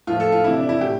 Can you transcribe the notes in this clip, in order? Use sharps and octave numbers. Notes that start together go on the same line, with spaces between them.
A2 F3 F4
A4
F4
C3 E3 E4
D4
E4
A2 G4